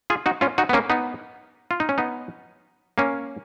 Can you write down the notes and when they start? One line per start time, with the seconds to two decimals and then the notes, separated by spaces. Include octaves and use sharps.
0.10 F4 G#4
0.26 D#4 F#4
0.41 C#4 F4
0.58 D#4 F#4
0.69 B3
0.73 A#3 C#4
0.90 B3 D#4
1.71 F4
1.80 D#4
1.89 C#4
1.98 B3 D#4
2.98 A#3 C#4